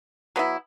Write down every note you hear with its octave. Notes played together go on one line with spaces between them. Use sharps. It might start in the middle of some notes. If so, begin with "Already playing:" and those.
F#3 B3 E4